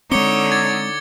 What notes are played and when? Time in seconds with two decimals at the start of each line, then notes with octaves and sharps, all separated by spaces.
0.11 D3 G#3 C4 D#4 C#5 D6 C#7 G7
0.52 G#6 A6